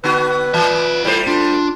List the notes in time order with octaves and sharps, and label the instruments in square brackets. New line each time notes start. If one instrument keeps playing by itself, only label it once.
[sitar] D3 B3 F#4 [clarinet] B4
[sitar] E3 [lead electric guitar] F4 E5
[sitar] G3 A3 C5 [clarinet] E4
[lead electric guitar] D4 [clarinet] F4